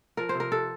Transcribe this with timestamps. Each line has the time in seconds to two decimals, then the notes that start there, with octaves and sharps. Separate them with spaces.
0.17 F3 A#4
0.29 C5
0.35 C3
0.40 A#4
0.52 C3 A4